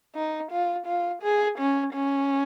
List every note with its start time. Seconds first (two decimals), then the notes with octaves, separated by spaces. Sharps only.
0.15 D#4
0.51 F4
0.86 F4
1.22 G#4
1.58 C#4
1.93 C#4